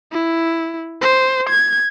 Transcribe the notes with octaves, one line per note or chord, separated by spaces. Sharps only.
E4
C5
G#6